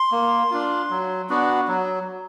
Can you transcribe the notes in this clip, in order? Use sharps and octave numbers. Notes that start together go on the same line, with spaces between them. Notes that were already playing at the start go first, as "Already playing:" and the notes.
Already playing: C6
A#3
D4 F4
F#3
B3 D4 F#4
F#3